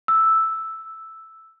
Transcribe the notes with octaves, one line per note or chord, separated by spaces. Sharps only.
E6